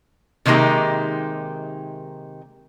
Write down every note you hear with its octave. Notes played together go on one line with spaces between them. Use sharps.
C3 D#3 G#3 A#3 D#4 G4